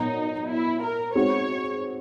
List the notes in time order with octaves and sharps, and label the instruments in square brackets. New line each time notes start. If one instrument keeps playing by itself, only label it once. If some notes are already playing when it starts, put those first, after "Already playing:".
Already playing: [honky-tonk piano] A#2 F#3 B3 [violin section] D#4
[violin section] E4
A#4
[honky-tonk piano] G#3 C4 D#4 F#4 [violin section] C#5